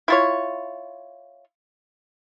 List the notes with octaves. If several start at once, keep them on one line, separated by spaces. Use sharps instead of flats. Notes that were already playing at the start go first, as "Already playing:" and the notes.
E4 F4 C#5